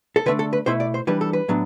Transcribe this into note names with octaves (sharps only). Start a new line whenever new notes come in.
A4
D3 A3 D4 B4
A4
B4
B2 A3 E4 C5
D5
C5
E3 G3 D4 B4
A4
B4
A2 F#3 B3 D4